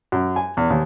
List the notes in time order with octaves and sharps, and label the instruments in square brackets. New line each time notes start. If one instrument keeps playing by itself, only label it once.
[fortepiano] F#2
G#5
E2
D#2